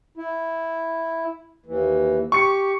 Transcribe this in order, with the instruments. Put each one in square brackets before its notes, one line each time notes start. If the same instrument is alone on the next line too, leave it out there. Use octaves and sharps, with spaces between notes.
[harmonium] E4
D#2 E3
[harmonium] G4 [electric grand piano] C#6 C#7